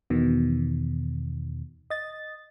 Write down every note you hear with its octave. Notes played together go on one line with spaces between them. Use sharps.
E2 B2 D#3
D#5 A6